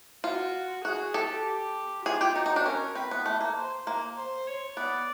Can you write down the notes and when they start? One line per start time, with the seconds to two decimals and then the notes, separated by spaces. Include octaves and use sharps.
0.24 F4 F#4
0.85 F#4 G#4
1.14 G4 A4
1.45 G4
2.05 F4 G#4
2.21 G4
2.36 D#4 F#4
2.46 D#4
2.56 D4
2.66 C#4 A#4
2.95 C4 B4
3.11 B3
3.26 A3
3.41 A#3
3.56 C5
3.87 A#3
4.17 C5
4.47 C#5
4.77 B3 D5